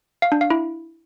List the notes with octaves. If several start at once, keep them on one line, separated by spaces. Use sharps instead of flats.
F5
D4
F5
E4